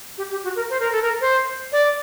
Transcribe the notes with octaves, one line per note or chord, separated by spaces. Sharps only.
G4
G4
F#4
A#4
C5
A#4
A4
A#4
C5
D5